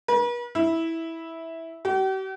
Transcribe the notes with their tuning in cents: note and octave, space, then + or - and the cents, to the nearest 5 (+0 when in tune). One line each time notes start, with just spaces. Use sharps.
B4 -45
E4 -10
G4 -45